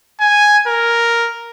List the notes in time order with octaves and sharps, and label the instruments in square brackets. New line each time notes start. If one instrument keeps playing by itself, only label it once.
[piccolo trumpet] G#5
A#4